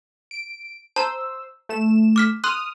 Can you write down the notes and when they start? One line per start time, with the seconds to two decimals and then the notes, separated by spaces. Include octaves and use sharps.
0.31 D7
0.96 C5 A5 A#5 E6
1.69 A3 E7
2.16 D6 F6 B6
2.44 C6 D#6 F6 F#6